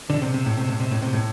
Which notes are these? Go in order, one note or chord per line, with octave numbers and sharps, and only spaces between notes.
D3
C3
C3
A2
C3
A2
C3
A2
C3
A2